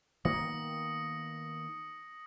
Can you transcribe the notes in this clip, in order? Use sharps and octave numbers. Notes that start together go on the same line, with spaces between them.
D#3 A#3 B3 D#6 A#6 C#7